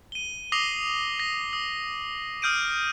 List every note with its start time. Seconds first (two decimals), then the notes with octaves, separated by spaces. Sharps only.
0.12 D#7 G7
0.52 D6 D#6 A#6 C7 F7 G7
1.19 A#6
1.53 D#6
2.42 D#6 F6 G6 D7 D#7